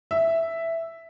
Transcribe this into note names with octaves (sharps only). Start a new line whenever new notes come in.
E5